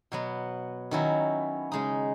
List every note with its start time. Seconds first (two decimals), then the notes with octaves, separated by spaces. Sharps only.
0.12 B2 F#3 B3
0.91 D#3 F#3 C#4 E4
1.72 C#3 G#3 D#4